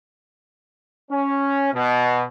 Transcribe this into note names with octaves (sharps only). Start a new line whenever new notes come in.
C#4
B2